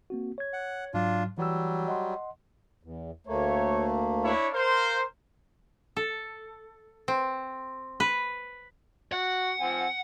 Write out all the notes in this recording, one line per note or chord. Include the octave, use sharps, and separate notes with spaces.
A#3 C4 F#4
C#5 G#6
F#5
G#2 F#3 D4 F4
E3 F#3 G3 E6
D#5 F#5 C6
E2
D2 A3 A#3 C#5
D4 E4 C#5
A#4 C5 F5
A4
C4
B4
F#4 F#5
F3 C4 G#5